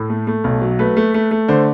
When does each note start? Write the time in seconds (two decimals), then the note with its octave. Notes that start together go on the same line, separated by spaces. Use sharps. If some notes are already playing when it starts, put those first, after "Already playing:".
Already playing: A2 A4
0.10 A3
0.27 A3
0.44 B1
0.61 F#3
0.79 A3 B4
0.97 A3
1.14 A3
1.31 A3
1.48 D3 C5